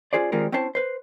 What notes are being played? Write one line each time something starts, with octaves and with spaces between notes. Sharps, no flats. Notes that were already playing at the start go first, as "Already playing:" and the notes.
C#4 F4 G#4 C5 D5
D#3 G3 G#3 C4 F4 A#4
C4 C#4 E4 C5 A5
B4 C5